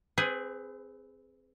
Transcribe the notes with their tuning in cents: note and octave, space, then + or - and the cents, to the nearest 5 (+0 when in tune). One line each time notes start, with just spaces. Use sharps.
C4 +0 G#4 +0 B4 +25